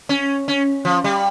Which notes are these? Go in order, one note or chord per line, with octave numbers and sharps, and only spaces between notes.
C#4
C#4
F3
G3